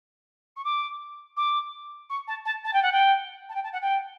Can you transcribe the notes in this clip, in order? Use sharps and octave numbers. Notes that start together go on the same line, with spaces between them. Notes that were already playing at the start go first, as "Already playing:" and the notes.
C#6
D6
D6
C#6
A5
A5
A5
G5
F#5
G5
A5
G5
A5
F#5
G5